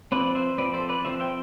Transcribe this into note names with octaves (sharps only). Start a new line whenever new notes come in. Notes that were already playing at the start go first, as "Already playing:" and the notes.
F3 C4 B4 D5
C5 E5
F3 C4 B4 D5
A4 C5
B4 D5
F3 C4 C5 E5
E5 G5